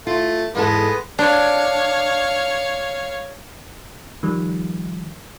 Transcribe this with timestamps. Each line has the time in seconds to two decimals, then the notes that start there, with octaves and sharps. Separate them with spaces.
0.07 A3 F4
0.55 E2 G#2 G#3 B3 A4
1.19 D4 C#5 F5
4.23 D#3 F3 G3